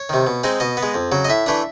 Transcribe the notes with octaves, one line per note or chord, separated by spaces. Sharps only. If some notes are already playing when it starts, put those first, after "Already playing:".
Already playing: C#5
C3 D#3
B2
G#3 C4 D#4
B2 D#5
B3
G#3
F2
C#3 F#3
D#5
A2 E5
E3 A3 D4